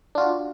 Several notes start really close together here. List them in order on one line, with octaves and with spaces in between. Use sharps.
D4 F4 F#4